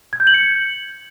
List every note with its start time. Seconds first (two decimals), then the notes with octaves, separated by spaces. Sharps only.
0.13 G#6
0.20 G6
0.27 F#7
0.34 C#7